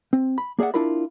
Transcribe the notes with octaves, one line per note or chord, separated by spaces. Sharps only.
C4
B5
A#3 G#4 D5 E5 F#5
D4 E4 F4 A#4 B5